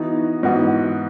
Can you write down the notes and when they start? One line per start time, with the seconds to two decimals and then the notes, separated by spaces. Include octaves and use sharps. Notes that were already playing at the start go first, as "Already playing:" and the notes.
Already playing: E3 B3 D#4 F#4
0.43 G#2 E3 B3 F#4